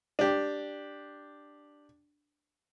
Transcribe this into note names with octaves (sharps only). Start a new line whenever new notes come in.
D4 G4